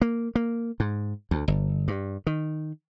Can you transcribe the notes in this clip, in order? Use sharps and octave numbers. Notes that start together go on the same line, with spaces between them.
A#3
A#3
G#2
D2
G1
G2
D#3